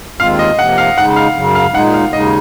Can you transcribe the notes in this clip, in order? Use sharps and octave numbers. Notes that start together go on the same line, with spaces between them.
D#2 D#3 G#3 C4 F4 F5
D#5
C3 F3 A#3 F#5
F5
C#3 G#3 D#4 F#5
F5
F#2 C#3 F#3
F5
A#2 G#3 D#4 F#5
F5
D#2 C#3 G#3 D#4 D#5